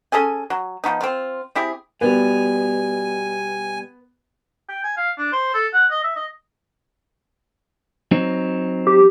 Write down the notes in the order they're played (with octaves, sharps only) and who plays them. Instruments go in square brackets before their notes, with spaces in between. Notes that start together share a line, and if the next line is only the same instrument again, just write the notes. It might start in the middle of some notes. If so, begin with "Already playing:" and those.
[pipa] C#4 G#4 A4 G#5
F#3
F3 F#3 B3 D#4
C4 F4
C4 E4 G4 G#4
[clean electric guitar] B2 G3 [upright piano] B3 [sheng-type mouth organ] G#5
[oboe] G5
G#5
F5
D4
C5
A4
F#5
D#5
E5
D#5
[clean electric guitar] F#3 C4 D#4
[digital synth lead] G4